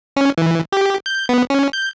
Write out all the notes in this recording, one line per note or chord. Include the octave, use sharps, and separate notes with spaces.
C#4
E3
G4
G6
B3
C#4
G6